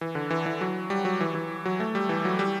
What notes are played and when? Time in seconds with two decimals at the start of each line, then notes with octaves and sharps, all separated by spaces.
0.01 E3
0.15 D3
0.30 E3
0.46 E3
0.61 F#3
0.90 G3
1.05 F#3
1.20 E3
1.35 E3
1.65 F#3
1.80 A3
1.95 G3
2.09 E3
2.25 F#3
2.39 G3